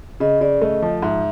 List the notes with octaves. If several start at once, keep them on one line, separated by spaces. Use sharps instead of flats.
C#3 D#5
C#3 D5
A3 D#5
F3
G#2 E5